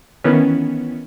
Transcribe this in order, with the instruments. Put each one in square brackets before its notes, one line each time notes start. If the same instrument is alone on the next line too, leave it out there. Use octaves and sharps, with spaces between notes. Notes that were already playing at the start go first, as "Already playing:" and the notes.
[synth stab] D#3 E3 B3 C#4